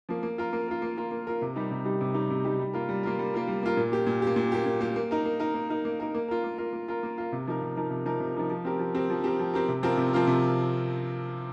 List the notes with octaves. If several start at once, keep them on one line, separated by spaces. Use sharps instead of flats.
F3 A#3
A#3
F4 A#4
A#3
F4 A#4
A#3
F4 A#4
A#3
F4 A#4
C3
G3 D#4 G4
C3
G3 D#4 G4
C3
G3 D#4 G4
C3
G3 D#4 G4
G3
A#3 F4 A#4
G3
A#3 F4 A#4
G3
A#3 F4 A#4
G3
A#3 F4 A#4
A#2
A#3 G4
A#2
A#3 G4
A#2
A#3 G4
A#2
A#3 G4
A#3
D#4 A#4
A#3
D#4 A#4
A#3
D#4 A#4
A#3
D#4 A#4
A#3
F4 A#4
A#3
F4 A#4
A#3
F4 A#4
A#3
F4 A#4
C3
F3 D#4 A#4
C3
F3 D#4 A#4
C3
F3 D#4 A#4
C3
F3 D#4 A#4
F3
C4 G4 A#4
F3
C4 G4 A#4
F3
C4 G4 A#4
F3
C4 G4 A#4
C3
F3 C4 F4 A#4
C3
F3 C4 F4 A#4
C3